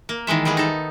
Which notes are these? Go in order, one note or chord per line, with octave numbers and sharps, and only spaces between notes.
A#3
D#3 E3 G#3 E5
G3 G#3 B3 G#4
D#4 A4